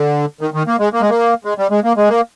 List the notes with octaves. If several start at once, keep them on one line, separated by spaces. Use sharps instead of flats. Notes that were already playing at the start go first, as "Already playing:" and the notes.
Already playing: D3
D#3
D#3
A#3
G#3
A#3
G#3
A#3
G#3
G3
G#3
A#3
G#3
A#3